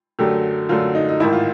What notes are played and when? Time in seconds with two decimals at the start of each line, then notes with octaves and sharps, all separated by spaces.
0.19 F#2 D3 F#3 A3 G4
0.69 F#2 D3 F#3 A3 F4
0.95 D#4
1.09 D#4
1.20 A1 G#2 D#3 E4
1.33 F4